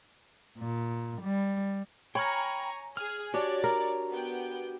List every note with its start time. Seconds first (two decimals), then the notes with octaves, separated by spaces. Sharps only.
0.57 A#2
1.20 G3
2.15 C#5 G5 G#5 A#5 B5 C#6 F6
2.97 G#4 F6
3.34 D4 F#4 G4 C#5 D5
3.64 A#4
4.10 B3 G5